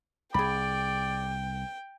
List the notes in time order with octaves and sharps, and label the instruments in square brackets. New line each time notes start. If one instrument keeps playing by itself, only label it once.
[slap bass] C2 [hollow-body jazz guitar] G#4 B5 [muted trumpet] D5 [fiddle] G5